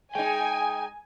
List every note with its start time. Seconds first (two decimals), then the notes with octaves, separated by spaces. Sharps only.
0.15 G#3 D#4 G5 G#5